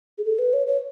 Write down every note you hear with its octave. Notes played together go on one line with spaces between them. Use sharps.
G#4
A4
B4
C#5
C#5